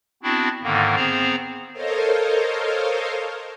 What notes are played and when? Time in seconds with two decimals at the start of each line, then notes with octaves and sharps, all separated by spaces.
0.23 B3 C4 D4 E4 F#4
0.63 G#2 D3 D#3 A#3
0.96 B3 C4 G#4 C5 A#5
1.72 A4 A#4 C5 C#5 D#5 F5